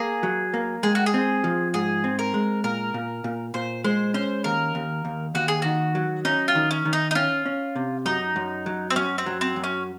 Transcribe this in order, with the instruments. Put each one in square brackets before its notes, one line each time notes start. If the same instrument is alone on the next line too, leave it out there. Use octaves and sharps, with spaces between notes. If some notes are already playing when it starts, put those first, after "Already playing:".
Already playing: [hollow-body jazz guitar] A#3 [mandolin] G#4
[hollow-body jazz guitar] F#3
A#3
[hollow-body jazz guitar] G#3 [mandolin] G#4
[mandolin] F#4
G#4
[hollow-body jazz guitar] C4
F3
[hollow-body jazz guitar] G#2 [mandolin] G#4
[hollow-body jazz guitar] C4
[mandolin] A#4
[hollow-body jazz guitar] G#3
[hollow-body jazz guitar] A#2 [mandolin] A#4
[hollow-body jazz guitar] A#2
A#2
[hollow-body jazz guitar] A#2 [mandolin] C5
[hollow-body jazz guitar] G#3 [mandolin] C5
[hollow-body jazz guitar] C#4 [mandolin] C5
[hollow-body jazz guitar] D#2 [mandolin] A#4
[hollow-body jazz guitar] D#2
D#2
[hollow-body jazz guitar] D#2 [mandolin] F#4
[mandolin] G#4
[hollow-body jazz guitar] D#3 [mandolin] F#4
[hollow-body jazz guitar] F#3
[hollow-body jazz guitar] C#4 [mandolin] D#4
[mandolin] F4
[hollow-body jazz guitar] D#3
[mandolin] C#4
[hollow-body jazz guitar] D#3
[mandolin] D#4
D#4
[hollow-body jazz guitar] C#4 [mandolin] F4
[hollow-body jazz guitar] C#4
C3
[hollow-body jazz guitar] F#2 [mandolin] D#4
[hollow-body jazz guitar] F#2
F#3
[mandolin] C4
[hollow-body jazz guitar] F#2 [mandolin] C#4
[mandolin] C4
[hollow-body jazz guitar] F#3
[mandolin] C4
[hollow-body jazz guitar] F#2
[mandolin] C#4